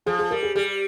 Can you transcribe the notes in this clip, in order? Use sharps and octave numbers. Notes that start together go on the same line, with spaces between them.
F3 G#4
G#4
G3 A#4
G#4
G3 G#4